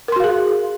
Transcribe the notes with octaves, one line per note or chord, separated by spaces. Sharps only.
F#4 G#4 A#4 F5 C6